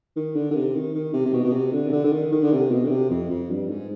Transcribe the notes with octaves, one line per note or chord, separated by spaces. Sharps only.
D#3
D3
D3
C3
D#3
D#3
C3
C3
B2
B2
C3
D3
C3
D3
D3
D#3
D#3
D3
C3
B2
D3
C3
F2
F2
G2
G#2